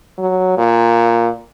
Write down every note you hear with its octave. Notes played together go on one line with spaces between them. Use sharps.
F#3
A#2